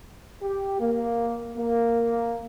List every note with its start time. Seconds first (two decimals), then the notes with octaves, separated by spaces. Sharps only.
0.43 G4
0.80 A#3
1.56 A#3